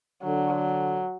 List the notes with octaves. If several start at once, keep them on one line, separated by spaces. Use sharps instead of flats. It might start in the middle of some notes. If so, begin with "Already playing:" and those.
D3 F#3